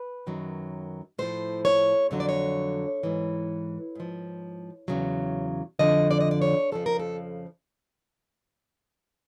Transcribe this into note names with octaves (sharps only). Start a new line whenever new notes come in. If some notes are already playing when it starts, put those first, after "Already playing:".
Already playing: B4
F#2 D#3 F#3
A2 F3 C5
C#5
F2 D3 F#3 C#5
D5
C#5
G#2 E3
G#2 F3
E2 C#3 F#3
F2 D3 F3 D#5
D5
D#5
D5
C#5
F2 C#3 F3 A4
A#4
A4